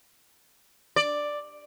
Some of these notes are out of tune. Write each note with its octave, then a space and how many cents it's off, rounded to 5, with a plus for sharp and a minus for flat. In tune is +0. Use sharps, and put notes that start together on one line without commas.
D5 +5